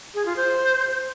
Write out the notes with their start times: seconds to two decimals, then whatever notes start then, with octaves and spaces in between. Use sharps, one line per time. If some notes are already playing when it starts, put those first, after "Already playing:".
0.15 G#4
0.25 F4
0.36 C5